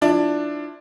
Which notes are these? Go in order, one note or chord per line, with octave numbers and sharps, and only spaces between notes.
F3 D4 E4